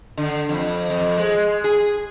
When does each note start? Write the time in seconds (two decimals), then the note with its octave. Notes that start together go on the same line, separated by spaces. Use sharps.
0.18 D3
0.49 F2
0.90 F2
1.18 G#3
1.64 G#4